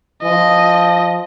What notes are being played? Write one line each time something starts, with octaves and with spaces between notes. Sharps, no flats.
F3 D#5